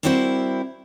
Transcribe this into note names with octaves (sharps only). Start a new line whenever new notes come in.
G3 C4 E4 F#4 A#4 C5